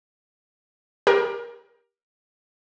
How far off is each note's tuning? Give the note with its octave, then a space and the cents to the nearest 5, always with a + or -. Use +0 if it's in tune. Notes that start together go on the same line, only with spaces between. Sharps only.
G4 +15 A#4 +25